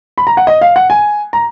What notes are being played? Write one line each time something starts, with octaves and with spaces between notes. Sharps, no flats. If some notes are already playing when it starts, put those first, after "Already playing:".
B5
A#5
F#5
D#5
F5
F#5
G#5
A#5